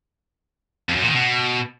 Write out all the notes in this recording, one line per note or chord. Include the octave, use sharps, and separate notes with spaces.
F2
F#2
A#2
D#3
B2